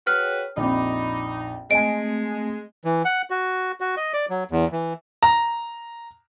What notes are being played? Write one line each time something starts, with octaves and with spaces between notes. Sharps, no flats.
F#4 G#4 B4 C#5 G5 F6
A#1 F2 D#4 B5 D6
G#3 A3 C4 D#5 G#5 D7
E3
F#5
F#4
F#4
D#5
D5
F#3
E2
E3
A#5